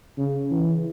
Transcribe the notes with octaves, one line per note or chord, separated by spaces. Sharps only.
C#3
E3